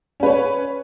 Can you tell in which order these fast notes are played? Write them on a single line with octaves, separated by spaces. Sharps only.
C#4 B4 C#5